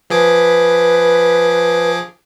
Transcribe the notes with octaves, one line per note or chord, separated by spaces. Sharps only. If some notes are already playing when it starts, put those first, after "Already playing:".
F3 G#4 B4 D6